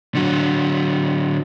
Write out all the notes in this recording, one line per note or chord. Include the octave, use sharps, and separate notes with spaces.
D3 F#3